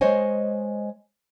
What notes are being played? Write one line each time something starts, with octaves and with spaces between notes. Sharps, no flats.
G#3 C5 C#5 D#5 G#5